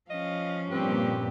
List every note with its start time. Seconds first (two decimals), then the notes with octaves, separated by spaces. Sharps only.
0.10 F3 C#4 D#5 F5
0.71 G2 A#2 C4 G4 B4